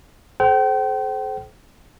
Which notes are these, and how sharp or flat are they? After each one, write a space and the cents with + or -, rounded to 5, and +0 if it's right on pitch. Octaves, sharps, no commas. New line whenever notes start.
A4 -40 C5 +0 G5 -40